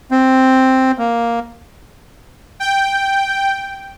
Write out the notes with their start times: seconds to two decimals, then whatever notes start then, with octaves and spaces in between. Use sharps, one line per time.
0.11 C4
0.98 A#3
2.60 G5